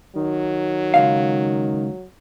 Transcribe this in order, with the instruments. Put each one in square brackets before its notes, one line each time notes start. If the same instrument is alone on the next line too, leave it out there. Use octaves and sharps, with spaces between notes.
[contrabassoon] D#3 [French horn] F#3
[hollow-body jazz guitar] C#2 G#2 F5